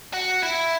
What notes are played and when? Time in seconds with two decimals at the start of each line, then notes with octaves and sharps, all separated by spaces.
0.13 F#4
0.43 E4